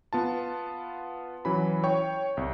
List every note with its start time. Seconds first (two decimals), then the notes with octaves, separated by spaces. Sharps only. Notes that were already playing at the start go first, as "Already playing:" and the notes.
0.13 B3 F4 A5
1.45 E3 F#3 C#4 B5
1.84 C#5 G5 C#6
2.37 C2